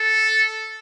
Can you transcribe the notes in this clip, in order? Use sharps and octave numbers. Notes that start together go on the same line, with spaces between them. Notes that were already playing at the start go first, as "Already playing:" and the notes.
Already playing: A4